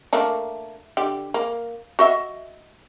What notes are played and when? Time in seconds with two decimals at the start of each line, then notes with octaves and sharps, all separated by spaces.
0.13 A3 A#3 D4
0.97 D3 G4
1.34 A#3
1.99 F#4 D#5 E5